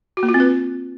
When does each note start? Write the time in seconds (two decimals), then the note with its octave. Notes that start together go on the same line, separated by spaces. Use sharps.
0.17 F#4
0.23 A#3
0.29 F4
0.34 C4
0.40 B4